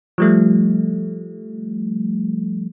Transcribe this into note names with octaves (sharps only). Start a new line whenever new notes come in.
F3 G3 A3